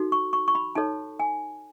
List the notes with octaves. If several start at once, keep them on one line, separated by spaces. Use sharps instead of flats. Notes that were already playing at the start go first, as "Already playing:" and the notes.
Already playing: D#4 F#4 A4
C#6
C#6
C#6
B5
D#4 A4 C#5 A5
G#5